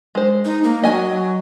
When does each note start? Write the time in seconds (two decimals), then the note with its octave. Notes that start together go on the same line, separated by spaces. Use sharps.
0.15 G#3 C5
0.45 D#4
0.64 A#3
0.83 F#3 D#5 G#5